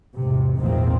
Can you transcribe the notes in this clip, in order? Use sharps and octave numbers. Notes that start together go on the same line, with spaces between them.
E2 G#2 C3
A#1 E2 G#2 D#3 A#3 C4